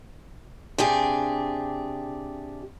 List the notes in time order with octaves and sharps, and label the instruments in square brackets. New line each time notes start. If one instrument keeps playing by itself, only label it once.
[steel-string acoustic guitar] C3 D4 G4 G#4